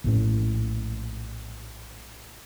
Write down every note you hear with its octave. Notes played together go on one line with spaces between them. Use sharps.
A#1 A2 C#4